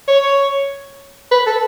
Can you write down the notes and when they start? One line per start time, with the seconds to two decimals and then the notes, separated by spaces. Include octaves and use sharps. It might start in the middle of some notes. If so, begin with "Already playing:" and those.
0.08 C#5
1.31 B4
1.47 A4